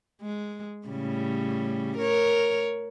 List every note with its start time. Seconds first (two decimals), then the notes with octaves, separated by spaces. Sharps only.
0.22 G#3
0.87 A2 C#3 G3
1.97 A#4 C#5